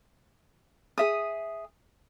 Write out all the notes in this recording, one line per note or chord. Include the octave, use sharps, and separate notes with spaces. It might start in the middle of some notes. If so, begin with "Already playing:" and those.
G#4 E5 D#6